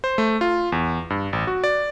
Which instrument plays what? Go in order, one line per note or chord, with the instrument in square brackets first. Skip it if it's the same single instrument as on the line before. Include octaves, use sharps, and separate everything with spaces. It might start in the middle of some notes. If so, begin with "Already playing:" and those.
[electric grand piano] C5
A3
F4
E2
G2
A1
F#4
D5